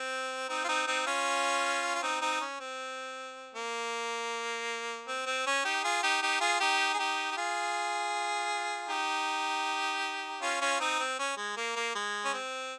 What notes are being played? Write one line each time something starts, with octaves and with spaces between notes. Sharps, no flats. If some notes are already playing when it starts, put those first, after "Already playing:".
Already playing: C4
C4 D#4
F4
C4 D#4
C4 D#4
C#4 F4
F4
C4 D#4
C4 D#4
C#4
C4
A#3
C4
C4
C#4
D#4 G4
F4 G#4
D#4 G4
D#4 G4
F4 G#4
D#4 G4
G#4
D#4 G4
G4
F4 G#4
D#4 G4
C#4 F4
C#4 F4
C4 D#4
C4
C#4
G#3
A#3
A#3
G#3
C#4
C4